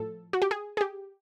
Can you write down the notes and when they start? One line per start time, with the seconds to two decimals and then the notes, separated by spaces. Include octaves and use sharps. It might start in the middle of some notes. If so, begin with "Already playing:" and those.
Already playing: A2 F3 A4
0.33 F#4
0.42 G4
0.51 G#4
0.77 G#4
0.81 G4